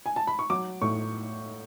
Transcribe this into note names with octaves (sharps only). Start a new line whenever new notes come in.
G#5
A5
B5
C#6
F#3 D6
A2 C#6